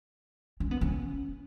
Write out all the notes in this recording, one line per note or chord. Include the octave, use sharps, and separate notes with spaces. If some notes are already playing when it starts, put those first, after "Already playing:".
C#4
B3
C#4